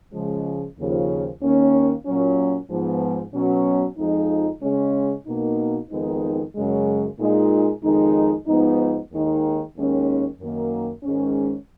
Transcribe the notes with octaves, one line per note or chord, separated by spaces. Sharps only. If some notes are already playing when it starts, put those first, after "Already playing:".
C#3 F3 G#3
D#2 C#3 F3
D#2 D#3 A#3 C#4
A#2 F#3 C#4
G#2 F3 B3
B2 F#3 C#4
F2 F3 G#3 D#4
C#3 G#3 C#4
B2 A#3 D#4
F2 D#3 G#3 B3 D#4
F#2 C#3 G#3
A#2 G#3 D#4
F2 D#3 G#3 D#4
G#2 F3 B3 D#4
D#2 D#3 G#3 D#4
D#2 D#3 G#3 C#4
F#2 D#3 A#3
G#2 D#3 G#3 C#4